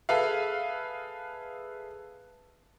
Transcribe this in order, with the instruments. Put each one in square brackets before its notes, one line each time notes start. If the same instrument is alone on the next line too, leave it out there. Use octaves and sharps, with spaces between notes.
[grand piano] G#4 A4 B4 E5 F5